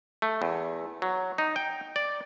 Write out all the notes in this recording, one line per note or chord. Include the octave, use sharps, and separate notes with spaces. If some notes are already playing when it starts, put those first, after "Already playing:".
A3
E2
F#3
D#4
G5
D5